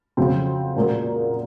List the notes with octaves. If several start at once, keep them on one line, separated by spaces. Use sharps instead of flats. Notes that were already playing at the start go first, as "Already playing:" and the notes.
F2 C#3 F#3 C4 F#4
A#2 G#3 C#4 F#4 A#4